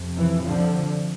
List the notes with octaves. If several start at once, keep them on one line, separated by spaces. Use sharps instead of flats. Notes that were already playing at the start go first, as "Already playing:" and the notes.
Already playing: F2 C3
E3
D3 F3